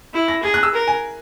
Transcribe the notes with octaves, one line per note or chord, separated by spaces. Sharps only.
E4
A#6
G#4 G#6
F#6
E6
A#4
G#5